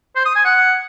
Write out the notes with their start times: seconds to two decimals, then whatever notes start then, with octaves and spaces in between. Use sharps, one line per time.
0.15 C5
0.25 D#6
0.35 G#5
0.45 F#5